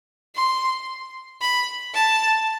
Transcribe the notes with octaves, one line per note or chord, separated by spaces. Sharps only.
C6
B5
A5